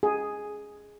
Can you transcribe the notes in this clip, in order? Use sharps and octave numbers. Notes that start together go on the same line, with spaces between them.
G#4